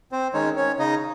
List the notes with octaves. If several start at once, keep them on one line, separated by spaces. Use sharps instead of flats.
C4 C5
D#3 G#3 C#4 D#4 C#5
C#4 C#5
C#3 D#4 D#5